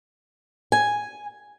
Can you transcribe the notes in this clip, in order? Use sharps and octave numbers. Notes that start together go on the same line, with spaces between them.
G#5